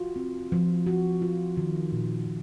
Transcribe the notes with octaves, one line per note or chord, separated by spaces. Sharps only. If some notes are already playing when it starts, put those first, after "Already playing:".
Already playing: F4 F#4
C4
F3
F#4
F4
D#3
A#2
A#2